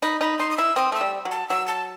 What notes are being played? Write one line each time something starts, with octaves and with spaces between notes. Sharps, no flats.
D#4 B5
D#4 B5
D#4 C6
D#6
E4 E6
C4 D#6
A3 E6
G3
F#3
A5
F#3 E6
A5